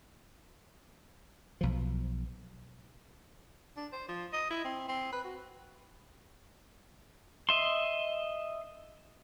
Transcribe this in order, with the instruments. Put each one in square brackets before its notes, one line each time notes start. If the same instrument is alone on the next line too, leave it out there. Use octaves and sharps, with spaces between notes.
[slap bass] B1 F3
[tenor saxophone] D4
C5
F3
D#5
E4
C4
C4
B4
F#4
[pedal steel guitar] D#5 E5 C6